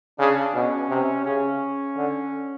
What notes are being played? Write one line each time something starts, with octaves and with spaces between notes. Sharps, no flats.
C#3 D4
B2 C#4
C3
C#3 C#4
D3